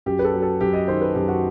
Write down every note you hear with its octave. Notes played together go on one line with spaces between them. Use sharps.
F#2 G4
B4
A4
F#3
A4
F#2 G4
D#5
D#3 C5
B4
F#2 G4
F#4